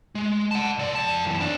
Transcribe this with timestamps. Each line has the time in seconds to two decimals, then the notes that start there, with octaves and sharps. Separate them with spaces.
0.15 G#3
0.51 F#5 A5
0.78 C#2 D5
0.95 F2 A5
1.25 F#2 E3
1.40 C4 D4